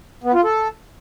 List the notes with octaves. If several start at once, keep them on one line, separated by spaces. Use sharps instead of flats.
B3
F4
A4